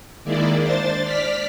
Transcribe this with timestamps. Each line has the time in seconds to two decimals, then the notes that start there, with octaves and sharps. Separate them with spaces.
0.24 D#3 G#3 A#3 E4 D5
0.61 D4 C5 A6
1.03 D5 F6 B6